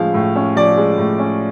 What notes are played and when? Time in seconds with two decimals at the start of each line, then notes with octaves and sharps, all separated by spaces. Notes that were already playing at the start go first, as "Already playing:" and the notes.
Already playing: A2 F3 G#3 C#4 F5
0.14 A2
0.36 C#4
0.56 F3 D5
0.77 G#3
0.98 A2
1.19 C#4